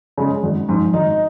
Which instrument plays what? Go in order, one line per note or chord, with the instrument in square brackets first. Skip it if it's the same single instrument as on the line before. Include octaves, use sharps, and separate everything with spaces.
[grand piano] C#3 G#3
G#1
G#2 F3
G#1 D#4